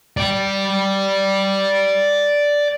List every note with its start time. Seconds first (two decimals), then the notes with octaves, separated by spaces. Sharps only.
0.17 D5 G5